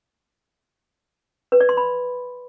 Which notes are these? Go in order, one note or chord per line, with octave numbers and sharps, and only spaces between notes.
B4
D5
C6
B5